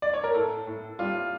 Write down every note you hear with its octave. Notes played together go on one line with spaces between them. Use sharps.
D5
C#5
A#4
A2 A4
A2
G3 F4